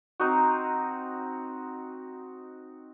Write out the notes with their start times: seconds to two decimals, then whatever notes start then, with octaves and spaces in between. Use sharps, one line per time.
0.20 C4 D#4 F#4